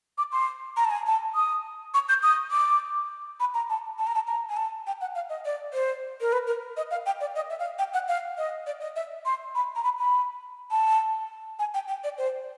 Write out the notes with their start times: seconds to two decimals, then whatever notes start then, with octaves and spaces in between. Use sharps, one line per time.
0.18 D6
0.32 C6
0.77 A#5
0.85 A5
0.91 G#5
1.06 A5
1.35 D#6
1.94 C#6
2.09 G6
2.23 D#6
2.51 D6
3.40 B5
3.54 A#5
3.70 A5
3.98 A5
4.07 A#5
4.15 A5
4.27 A#5
4.49 G#5
4.57 A5
4.87 G5
5.01 F#5
5.15 F5
5.29 D#5
5.45 D5
5.73 C5
6.21 A#4
6.32 B4
6.47 A#4
6.77 D#5
6.91 F5
7.06 G5
7.21 D5
7.35 D#5
7.50 E5
7.59 F5
7.79 G5
7.94 F#5
8.08 F5
8.38 D#5
8.66 D5
8.81 D#5
8.96 E5
9.25 C6
9.55 B5
9.76 A#5
9.84 B5
9.99 B5
10.71 A5
11.59 G#5
11.74 G5
11.88 G5
12.04 D5
12.18 C5